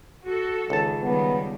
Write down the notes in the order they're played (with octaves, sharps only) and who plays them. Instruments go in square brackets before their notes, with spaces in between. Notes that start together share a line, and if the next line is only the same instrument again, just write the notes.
[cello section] F#4 A4
[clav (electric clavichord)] C#2 A5 [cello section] D#3
[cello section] D#3 G3 [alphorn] B3